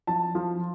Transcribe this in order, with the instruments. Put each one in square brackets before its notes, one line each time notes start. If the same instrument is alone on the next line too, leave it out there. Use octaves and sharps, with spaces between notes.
[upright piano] F3 A5
F3